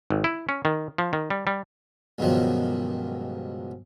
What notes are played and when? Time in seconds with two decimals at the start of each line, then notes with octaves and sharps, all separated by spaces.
0.10 G#1
0.24 E4
0.49 C#4
0.65 D#3
0.98 F3
1.13 D#3
1.30 G3
1.47 G3
2.18 C#2 G2 B2 D#3 F3 F#3